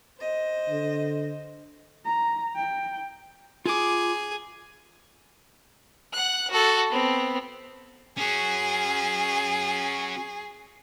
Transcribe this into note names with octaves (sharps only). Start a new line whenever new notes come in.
C5 D#5
D3
A#5
G5
F4 G#4 D6
F#5 F#6
F#4 A4
B3 C4
C#4 F#4 G#4